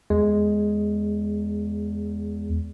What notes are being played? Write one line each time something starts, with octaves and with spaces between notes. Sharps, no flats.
E2 G#3